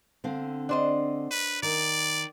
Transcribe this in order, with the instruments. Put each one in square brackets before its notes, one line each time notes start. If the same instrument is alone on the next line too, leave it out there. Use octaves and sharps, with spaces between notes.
[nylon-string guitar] D3 C4 F5
[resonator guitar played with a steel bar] D4 C5 D#5
[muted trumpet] B4
[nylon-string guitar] D#3 [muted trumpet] D5